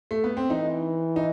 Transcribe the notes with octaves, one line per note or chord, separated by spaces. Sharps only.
A3
B3
C4
E3 D#4
D#4